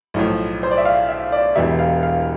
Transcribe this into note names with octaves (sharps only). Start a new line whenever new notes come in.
B1 A2 F3
C5
D5
E5
F5
E5
D5
E1 E2 B2 G3 E5
F5
F5